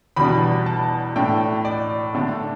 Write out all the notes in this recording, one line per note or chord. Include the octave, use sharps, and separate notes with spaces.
E2 B2 G3 D4 B5
A5
A2 A3 D4 G5
D5
D3 A3 D4